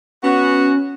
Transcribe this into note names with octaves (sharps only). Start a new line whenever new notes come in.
B3 C#4 F#4